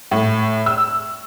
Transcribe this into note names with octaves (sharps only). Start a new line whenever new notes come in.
A2
E6